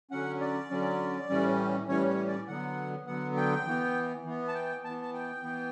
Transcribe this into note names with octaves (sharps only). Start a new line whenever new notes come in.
D3 F#3 C#4 F#5
D5
D3 F#3 C#4
A2 E3 G3 C#4
A2 E3 G3 C#4 C#5
C#5
D5
D3 F#3 B3 F#5
D3 F#3 B3 F#5
G5
E3 B3
E3 B3
A5
G5
E3 B3 A5
A5
G5
E3 B3